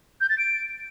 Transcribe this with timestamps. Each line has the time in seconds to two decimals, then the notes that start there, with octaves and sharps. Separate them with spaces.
0.21 G6
0.29 A6
0.38 D7